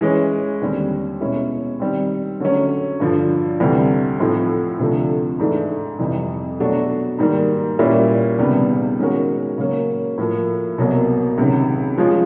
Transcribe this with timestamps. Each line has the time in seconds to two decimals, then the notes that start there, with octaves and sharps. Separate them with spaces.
0.01 E3 G#3 C#4
0.61 D#2 D3 G3 C4
1.21 B2 G#3 C#4 E4
1.80 D#3 G3 C4
2.40 D3 F#3 A3 C#4
3.00 G2 D3 F3
3.60 D2 C3 E3 G3 C4
4.20 A2 F3 A3 C4 D#4
4.79 D2 C3 F3 A3 D4
5.40 G#2 E3 A3 D4
5.99 F2 C3 E3 G3
6.59 B2 F#3 A3 D4 F#4
7.19 G#2 D#3 G3 A#3
7.79 A#2 G3 A#3 C#4 E4
8.38 C#2 C3 D#3 G3 B3
8.98 D#3 G#3 C#4 F#4 A#4
9.58 C#3 F#3 A#3 C#4
10.18 A2 F3 A#3
10.78 C2 B2 F#3 A#3
11.38 C#2 C3 D#3 F#3
11.98 F3 G#3 C#4 F4